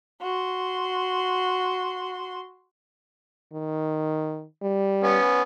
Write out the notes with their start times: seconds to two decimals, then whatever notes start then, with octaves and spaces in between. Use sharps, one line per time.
0.21 F#4 C6
3.53 D#3
4.63 G3
5.04 B3 C#4